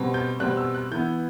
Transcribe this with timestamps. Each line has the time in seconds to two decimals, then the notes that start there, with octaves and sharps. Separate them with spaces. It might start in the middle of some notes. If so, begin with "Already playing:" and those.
Already playing: B2 G3 C4
0.14 G6
0.40 B2 G3 C4 F#6
0.57 E6
0.74 F#6
0.91 E3 B3 G6